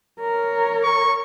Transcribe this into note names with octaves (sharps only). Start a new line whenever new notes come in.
A#4 C#5
C#6